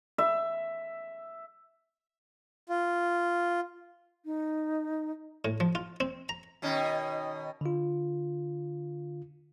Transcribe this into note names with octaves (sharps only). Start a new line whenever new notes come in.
E5
F4
D#4
A2
F3
F4
C4
A#5
B2 D#3 C#4
D3 F4